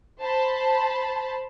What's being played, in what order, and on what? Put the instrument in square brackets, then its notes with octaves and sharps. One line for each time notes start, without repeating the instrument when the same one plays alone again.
[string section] C5 A5 B5